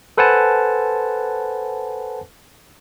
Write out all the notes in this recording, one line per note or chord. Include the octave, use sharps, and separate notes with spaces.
A4 B4 C5 F#5 G#5 A5